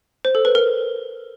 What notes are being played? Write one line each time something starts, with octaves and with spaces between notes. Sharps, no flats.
C5
A4
B4
A#4